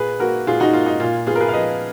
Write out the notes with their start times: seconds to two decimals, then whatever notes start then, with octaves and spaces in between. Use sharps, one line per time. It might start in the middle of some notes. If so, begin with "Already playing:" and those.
Already playing: A#2 G#4 B4
0.20 A#3 F#4 A#4
0.47 A#2 F4 G#4
0.60 D#4 F#4
0.73 A#3 F4
0.86 D#4
1.00 A#2 F4
1.27 B3 F4 G#4
1.36 A#4
1.40 G#4 B4
1.49 F5
1.53 F3 B4 D#5